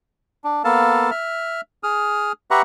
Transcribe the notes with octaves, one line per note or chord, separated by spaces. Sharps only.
D4
A#3 B3 A4 F5 A5
E5 F6
G#4 D#6 F6
G4 B4 E5 F#5 A#5 C#6